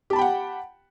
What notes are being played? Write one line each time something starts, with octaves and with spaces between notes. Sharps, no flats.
G4 F#5 G5 A5 B5